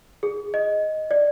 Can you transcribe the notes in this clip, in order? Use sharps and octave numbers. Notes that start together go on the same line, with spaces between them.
G#4
D#5
D5